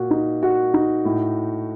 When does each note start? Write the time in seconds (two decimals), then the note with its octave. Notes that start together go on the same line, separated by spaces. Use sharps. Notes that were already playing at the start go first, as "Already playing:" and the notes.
Already playing: A#2 F#4
0.11 D#4
0.43 F#4
0.74 D#4
1.05 A2